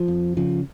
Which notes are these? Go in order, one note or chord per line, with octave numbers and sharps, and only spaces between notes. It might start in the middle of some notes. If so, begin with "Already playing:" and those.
Already playing: F3
F2
C#3 F3